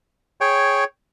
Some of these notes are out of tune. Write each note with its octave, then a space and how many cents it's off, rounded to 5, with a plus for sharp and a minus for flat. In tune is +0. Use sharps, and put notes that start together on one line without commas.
G#4 +0 C#5 -5 G5 +0